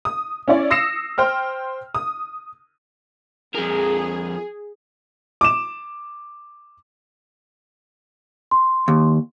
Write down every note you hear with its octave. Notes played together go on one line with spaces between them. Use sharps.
D#6
C#4 E4 C#5 D5
D#6 E6 A#6 C7 C#7 E7
C5 G5 F6
D#6
F2 G#4 A#4
D6 E7
C6
D#2